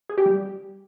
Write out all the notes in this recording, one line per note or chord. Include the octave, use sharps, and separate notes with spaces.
G#4
G4
G3